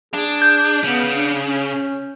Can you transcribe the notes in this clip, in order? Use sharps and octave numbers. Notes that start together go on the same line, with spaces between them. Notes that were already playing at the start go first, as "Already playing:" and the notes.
D4 G#4
G6
C#3 B3
D4
C#4